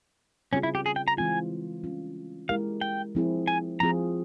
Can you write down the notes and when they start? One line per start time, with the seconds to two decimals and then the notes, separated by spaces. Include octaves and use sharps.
0.53 C#3 G3 C4 C#4 F4 G#4
0.63 E4
0.75 G4
0.86 G#4
0.96 G5
1.08 A#5
1.18 E3 G#3 C4 F4 G#5
1.83 G3 C#4 F4
2.49 G#3 E4 G4 A#4 F5
2.81 G5
3.15 F3 C4 E4 G#4
3.48 G#5
3.80 F3 C4 F4 G#4 A#5